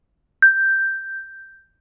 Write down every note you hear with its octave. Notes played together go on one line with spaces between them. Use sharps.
G6